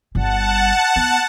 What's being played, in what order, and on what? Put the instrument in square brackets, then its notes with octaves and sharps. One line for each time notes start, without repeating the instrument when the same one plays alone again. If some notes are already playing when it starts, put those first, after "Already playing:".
[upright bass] G1 G3 [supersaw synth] F#5 A5
[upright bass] B3